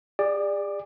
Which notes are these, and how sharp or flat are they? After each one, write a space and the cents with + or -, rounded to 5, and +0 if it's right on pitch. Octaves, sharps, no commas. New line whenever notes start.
G#4 -40 D5 +10